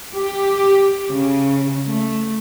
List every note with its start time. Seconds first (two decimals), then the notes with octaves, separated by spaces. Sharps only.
0.14 G4
1.11 C#3
1.87 A3